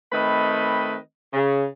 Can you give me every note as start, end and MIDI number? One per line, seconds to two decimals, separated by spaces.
0.13 0.97 51
0.13 0.97 57
0.13 0.97 60
0.13 0.97 71
0.13 0.97 75
0.13 0.97 83
1.34 1.66 49